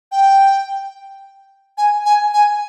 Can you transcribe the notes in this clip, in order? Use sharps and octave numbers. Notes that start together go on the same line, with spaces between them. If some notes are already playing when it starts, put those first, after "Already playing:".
G5
G#5
G#5
G#5